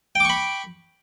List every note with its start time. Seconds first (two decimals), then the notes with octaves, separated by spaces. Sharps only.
0.15 G5
0.20 D6
0.25 C#6
0.30 B5